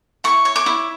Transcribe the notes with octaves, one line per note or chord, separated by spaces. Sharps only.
E4 C#6
C#5
D6
E4